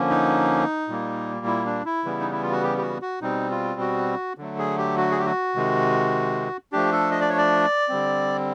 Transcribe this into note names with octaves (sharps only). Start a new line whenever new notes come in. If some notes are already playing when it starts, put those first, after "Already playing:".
Already playing: D3 F3 A#3 C#4
D#4
A#2 G3 A#3
E4
D4
E4
C#3 E3 G3 B3
D#4
E4
F4
F#4
G4
G4
F#4
F#4
B2 G3 C4 D#4
F4
F#4
D3 F#3 A3
G#4
G4
F#4
G#4
G4
F#4
C3 D#3 G#3
F3 A3 D4 G4
A4
D#5
D5
C#5
D5
D3 G3 C4